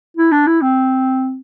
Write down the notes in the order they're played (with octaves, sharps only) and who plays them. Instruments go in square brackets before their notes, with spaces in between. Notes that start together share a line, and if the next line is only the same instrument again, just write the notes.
[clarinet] E4
D4
E4
C4